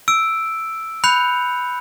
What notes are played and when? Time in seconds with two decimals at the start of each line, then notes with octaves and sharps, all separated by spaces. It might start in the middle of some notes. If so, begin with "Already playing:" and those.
0.08 E6 D7
1.04 B5 F#6 G6 C#7 F7